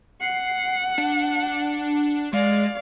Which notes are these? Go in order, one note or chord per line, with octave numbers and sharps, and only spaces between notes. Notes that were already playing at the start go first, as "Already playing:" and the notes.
F#5 C7
D4
G#3 D5 F5